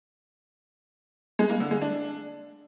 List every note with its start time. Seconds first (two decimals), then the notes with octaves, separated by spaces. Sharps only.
1.39 G#3
1.50 A#3
1.60 D3
1.71 G#3
1.82 D4